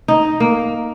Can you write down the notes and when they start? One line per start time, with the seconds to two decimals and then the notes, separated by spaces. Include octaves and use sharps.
0.08 D#4
0.40 A#3